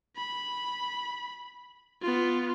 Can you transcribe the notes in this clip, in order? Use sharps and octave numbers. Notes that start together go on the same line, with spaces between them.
B5
B3 F4